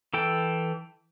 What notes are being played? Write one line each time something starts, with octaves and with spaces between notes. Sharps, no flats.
E3 A4 G5